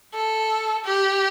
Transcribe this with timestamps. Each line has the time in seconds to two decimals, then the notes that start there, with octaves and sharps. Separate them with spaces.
0.14 A4
0.85 G4